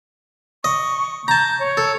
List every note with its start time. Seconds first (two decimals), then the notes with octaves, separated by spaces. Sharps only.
0.64 D#5 C#6
1.28 A5 A#5 G6
1.60 C#5
1.77 A4